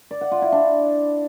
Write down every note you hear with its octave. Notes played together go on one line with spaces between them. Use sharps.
D5
F#5
F4
E4
D4